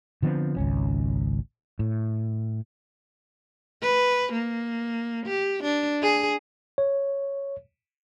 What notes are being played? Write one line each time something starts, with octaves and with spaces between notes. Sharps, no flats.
D3 F3 B3 C4
G#1 C#2 C#4
A2
B4
A#3
G4
D4
G#4
C#5